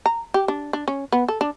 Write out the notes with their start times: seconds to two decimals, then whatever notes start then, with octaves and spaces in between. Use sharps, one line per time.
0.06 A#5
0.34 G4
0.48 D4
0.73 D4
0.88 C#4
1.12 B3
1.28 A4
1.41 D4